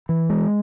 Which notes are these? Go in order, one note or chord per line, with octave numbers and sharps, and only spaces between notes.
E3
G#3